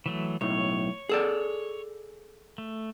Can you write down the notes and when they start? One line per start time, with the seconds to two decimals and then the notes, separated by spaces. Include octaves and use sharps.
0.06 E3 F#3 A3
0.41 B1 A2 C#5
1.09 G#4 A4 D5
2.58 A3